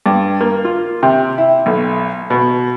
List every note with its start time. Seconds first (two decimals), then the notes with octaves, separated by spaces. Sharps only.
0.06 G2
0.41 A#3
0.65 F4
1.03 C3
1.38 E4
1.66 B1
2.30 B2